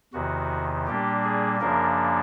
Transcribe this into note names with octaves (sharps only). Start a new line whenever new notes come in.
E2 C3 D#3 F#4
A#2 G3 A#3 D4 G4
G#4
F#2 C#3 F3 A#3 D4 A#4